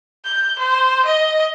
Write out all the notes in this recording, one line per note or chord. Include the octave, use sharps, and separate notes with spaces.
G6
C5
D#5